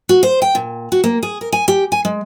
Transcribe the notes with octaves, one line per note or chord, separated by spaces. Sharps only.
F#4
C5
G5
A#2
F#4
A#3
G#4
A#4
G#5
G4
G#5
G#3